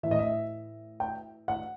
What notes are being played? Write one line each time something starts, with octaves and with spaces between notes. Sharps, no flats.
A2 E3 D#5 E5
E5
G5
F#5